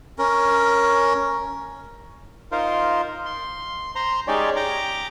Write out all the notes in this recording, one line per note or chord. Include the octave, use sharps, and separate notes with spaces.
C#4 A#4
D#4 F4 A#4 C5
C6
C5 A#5 C6
G#3 C#4 D#4 G4 C#5 D5
G4 A#5 D6